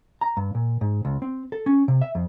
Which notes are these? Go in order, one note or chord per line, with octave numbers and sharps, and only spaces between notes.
A#5
G2
A#2
G#2
C#2
C4
A4
C#4
C3
E5
F2